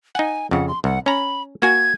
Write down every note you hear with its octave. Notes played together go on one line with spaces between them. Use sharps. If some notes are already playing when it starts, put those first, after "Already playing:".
D#4 F#5 G#5
F2 C#3 F#5
C6
C2 F#5
C#4 A#5 B5
A#3 F#4 G#5 G#6